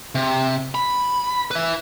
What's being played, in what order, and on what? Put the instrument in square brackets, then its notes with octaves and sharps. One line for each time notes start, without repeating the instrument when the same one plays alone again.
[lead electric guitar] C3
B5
B4 E5